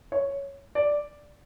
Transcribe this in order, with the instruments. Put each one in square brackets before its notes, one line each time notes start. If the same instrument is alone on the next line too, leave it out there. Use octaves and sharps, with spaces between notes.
[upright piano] C#5
D5